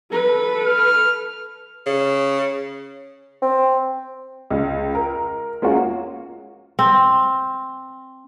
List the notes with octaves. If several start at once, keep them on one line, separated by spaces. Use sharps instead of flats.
A4 B4
F6
C#3
C4
C#2
A#4
G#3 A#3 C#4 F4 F#4
C4